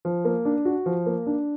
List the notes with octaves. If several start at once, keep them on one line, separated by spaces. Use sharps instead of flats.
F3
A#3
D4
F#4
F3
A#3
D4